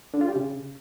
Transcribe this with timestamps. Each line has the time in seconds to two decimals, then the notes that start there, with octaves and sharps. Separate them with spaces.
0.14 D3
0.21 F4
0.28 G3
0.35 C#3